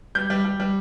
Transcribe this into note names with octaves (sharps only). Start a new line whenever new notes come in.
G3 G6
G3
G3
G3